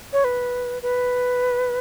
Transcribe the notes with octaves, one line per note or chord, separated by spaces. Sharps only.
C#5
B4
B4